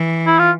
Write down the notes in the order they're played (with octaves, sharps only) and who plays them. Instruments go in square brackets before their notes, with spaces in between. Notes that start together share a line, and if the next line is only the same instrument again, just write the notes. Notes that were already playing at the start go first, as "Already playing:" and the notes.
Already playing: [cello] E3
[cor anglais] E4
F4